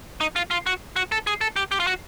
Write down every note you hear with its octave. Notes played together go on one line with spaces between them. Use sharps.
D#4
F4
F4
F#4
F#4
A4
G#4
A4
G4
G4
F4
F#4